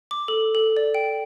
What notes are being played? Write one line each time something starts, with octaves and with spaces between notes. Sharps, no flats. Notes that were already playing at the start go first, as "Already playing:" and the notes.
D6
A4
A4
D5
G5